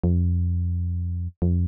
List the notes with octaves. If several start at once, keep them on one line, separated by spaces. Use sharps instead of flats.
F2
F2